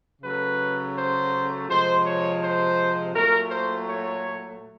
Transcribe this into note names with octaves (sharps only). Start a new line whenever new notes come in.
C#3 F#3 A3 B4
C5
C3 F3 G#3 C5
C#5
C5
A#2 F#3 A3 A#4
C5
C#5